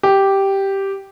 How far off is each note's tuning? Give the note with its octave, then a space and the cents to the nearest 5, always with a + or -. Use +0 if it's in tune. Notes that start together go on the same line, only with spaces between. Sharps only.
G4 -5